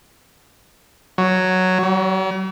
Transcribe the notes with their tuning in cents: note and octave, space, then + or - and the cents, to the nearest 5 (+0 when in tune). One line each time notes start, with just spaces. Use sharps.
F#3 +0
F#3 +45